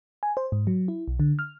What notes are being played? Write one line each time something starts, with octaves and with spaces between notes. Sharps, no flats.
G#5
C5
G#2
F#3
E4
B1
D3
F6